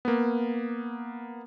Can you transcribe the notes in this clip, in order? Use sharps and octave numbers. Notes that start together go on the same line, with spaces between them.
A#3 B3